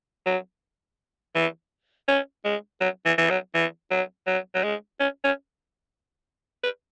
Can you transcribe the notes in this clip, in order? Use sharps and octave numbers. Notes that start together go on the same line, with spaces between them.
F#3
E3
C#4
G#3
F#3
E3
E3
F#3
E3
F#3
F#3
F#3
G#3
C#4
C#4
B4